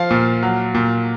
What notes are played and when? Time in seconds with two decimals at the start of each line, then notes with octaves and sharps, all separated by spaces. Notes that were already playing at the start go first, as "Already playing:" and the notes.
Already playing: F3 F5
0.11 A#2
0.43 F#3
0.74 A#2